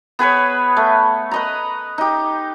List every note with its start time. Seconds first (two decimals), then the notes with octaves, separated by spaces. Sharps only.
0.19 B3 G#4 B4 C#5
0.77 A3
1.31 B4 D#5 A#5
1.98 D#4 G4